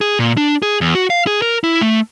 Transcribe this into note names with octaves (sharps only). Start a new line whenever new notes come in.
G#4
A#2
D4
G#4
E2
F#4
F5
G#4
A#4
E4
A3